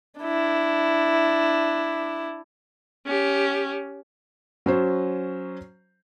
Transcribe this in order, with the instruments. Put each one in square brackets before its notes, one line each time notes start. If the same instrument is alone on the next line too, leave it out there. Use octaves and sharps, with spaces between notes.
[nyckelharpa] D4 E4
[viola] C#4 G4
[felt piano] F#3 C#4 C5